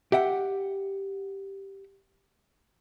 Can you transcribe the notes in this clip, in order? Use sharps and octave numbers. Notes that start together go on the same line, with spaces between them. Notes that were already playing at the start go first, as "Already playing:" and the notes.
G4 E5 F#5 G5